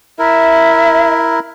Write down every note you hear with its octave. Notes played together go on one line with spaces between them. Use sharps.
E4 A#4 E5